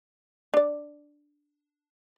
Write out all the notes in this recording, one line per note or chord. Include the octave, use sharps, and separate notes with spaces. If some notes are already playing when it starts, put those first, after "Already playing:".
D4 D5